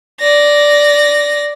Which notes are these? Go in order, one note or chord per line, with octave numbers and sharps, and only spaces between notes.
D5 A#6